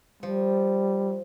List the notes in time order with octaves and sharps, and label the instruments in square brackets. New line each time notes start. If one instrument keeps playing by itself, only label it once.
[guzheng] F3 [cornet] G3